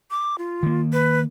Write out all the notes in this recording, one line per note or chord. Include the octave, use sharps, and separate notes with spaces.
D6
F4
D#3 A#3
B4